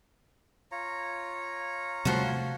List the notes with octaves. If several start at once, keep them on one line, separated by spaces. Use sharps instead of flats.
F4 C#5 A#5
C3 F3 G3 A3 F#4